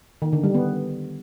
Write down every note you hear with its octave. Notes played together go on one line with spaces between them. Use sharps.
D#3
D3
G3
B3